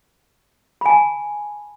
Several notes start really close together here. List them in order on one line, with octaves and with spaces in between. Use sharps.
B5 G#5 A5